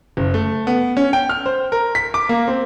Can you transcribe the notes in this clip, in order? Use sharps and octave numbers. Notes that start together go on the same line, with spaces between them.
F#1
A3
B3
C#4
G5
F6
C5
A#4
B6
D6
A#3
C4